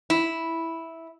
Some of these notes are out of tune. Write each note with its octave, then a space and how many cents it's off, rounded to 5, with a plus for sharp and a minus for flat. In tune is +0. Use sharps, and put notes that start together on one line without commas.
E4 -5